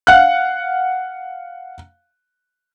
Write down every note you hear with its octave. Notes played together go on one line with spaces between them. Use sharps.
F5 F#5 F#6